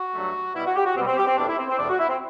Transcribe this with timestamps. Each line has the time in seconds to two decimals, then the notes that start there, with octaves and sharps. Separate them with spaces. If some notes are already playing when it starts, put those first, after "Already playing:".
Already playing: F#4
0.14 G2 F#3 A3
0.55 B2 G3 E4
0.66 F#4
0.76 G4
0.86 F#4
0.96 B2 C4
1.01 G3
1.07 C4
1.17 G4
1.27 C4
1.37 E2 B2 A3 D4
1.47 E4
1.58 C4
1.69 C4
1.78 E2 B2 A3 D4
1.89 F#4
1.99 E4
2.09 C4